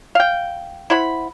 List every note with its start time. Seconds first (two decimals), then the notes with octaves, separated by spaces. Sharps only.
0.15 F5 G5
0.90 E4 C5 F#5 B5